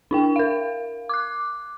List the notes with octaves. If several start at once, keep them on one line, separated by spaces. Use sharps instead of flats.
D4 E4 G5
A#4 F5
D6 F#6